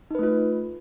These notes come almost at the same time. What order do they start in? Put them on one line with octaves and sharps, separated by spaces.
D#4 B4 A3 F4